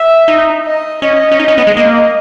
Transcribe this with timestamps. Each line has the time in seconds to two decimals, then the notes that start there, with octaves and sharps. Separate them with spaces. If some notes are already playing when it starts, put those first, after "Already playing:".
Already playing: E5
0.28 D#4
0.65 D#5
1.02 C#4 D#5
1.31 C#4
1.39 D#4
1.48 C#4
1.58 B3
1.67 G#3
1.77 A#3